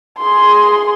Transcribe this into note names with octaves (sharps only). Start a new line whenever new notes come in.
G#4 C6